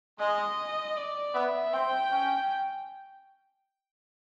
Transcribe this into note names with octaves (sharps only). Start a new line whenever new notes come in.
G#3 D#5
D5
B3 E5
C4 G5
C#4